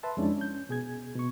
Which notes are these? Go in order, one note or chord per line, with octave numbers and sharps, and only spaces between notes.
B4 E5 A5 C6
F2 G#3 C#4 D4 E4
C#4 G6
B2 G#4 G#6
B2 C#6